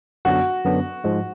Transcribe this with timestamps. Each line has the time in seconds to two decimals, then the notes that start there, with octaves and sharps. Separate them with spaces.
0.25 F#2 D3 F#3 B3 D4 F#4
0.65 F#2 D3 F#3 B3 D4
1.04 G#2 F3 G#3